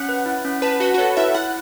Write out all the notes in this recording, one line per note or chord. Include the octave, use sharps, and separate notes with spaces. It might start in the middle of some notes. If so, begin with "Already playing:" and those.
Already playing: C#4 F#5
B4
E4
C#4
B4 A5
F#4 F#5
F#4
A4 C#5
E4 E5
E4 F#5